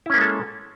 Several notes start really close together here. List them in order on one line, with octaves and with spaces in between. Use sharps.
E4 C#4 A#3 G#3 A4